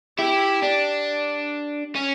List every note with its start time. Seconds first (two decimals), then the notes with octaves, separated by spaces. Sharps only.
0.18 E4 G4
0.63 D4
1.95 C#4